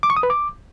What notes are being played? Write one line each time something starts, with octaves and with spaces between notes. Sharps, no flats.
D6
C#6
D#6
B4
D6